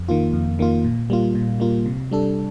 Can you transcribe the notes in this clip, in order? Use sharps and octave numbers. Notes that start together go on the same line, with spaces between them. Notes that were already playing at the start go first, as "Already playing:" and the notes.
Already playing: F2
D#3 A#3 F4
F2
D#3 A#3 F4
A#2
G3 A#3 F4
A#2
G3 A#3 F4
C3
G3 D4 A4